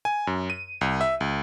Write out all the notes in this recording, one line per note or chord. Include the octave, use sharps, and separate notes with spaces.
G#5
F#2
D#7
C2
E5
C#2